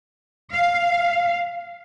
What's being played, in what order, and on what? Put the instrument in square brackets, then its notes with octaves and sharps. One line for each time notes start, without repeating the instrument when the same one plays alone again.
[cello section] F5